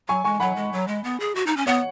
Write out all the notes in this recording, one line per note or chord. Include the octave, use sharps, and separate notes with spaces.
F#3 G#5 C#6
G#3 G#5 C#6
F#3 F#5 B5
G#3
F#3
G#3
B3
G#4
F#4
D#4
C#4
B3 C#5 F#5